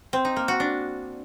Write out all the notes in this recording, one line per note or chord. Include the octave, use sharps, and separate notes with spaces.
C4
D#4
A#3
F#4
D4